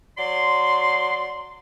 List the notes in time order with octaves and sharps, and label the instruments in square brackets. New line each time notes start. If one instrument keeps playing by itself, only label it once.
[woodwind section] F#3 D5 C6